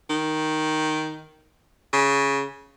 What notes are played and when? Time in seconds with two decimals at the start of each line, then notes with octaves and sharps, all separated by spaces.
0.09 D#3
1.93 C#3